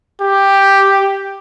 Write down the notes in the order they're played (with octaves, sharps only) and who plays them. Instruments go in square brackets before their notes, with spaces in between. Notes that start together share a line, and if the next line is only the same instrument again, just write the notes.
[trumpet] G4